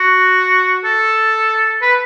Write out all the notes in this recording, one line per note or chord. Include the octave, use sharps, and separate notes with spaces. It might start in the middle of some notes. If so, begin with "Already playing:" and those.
Already playing: F#4
A4
B4